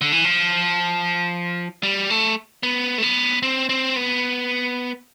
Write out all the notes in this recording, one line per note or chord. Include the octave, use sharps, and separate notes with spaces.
D3
E3
F3
G3
A3
B3
A3
B3
C4
C4
B3